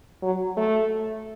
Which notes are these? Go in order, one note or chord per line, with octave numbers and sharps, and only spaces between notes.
F#3
A3